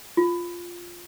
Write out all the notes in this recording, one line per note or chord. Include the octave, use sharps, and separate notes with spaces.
F4